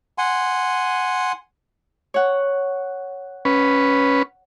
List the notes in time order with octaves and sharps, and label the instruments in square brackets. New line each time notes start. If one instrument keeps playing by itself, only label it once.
[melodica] F#5 G#5 C6
[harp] C#5 F#5
[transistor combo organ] C#4 B4